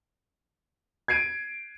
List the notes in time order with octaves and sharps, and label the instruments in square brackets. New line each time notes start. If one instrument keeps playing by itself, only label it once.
[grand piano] G#6 C7 D7 D#7